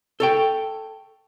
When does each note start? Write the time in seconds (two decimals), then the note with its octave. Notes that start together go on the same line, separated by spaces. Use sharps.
0.20 A4 C#5 G5